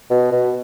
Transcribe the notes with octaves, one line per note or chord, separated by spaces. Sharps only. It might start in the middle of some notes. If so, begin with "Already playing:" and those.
B2
B2